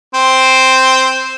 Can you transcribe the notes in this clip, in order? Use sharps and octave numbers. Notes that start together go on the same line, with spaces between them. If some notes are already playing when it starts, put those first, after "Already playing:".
C4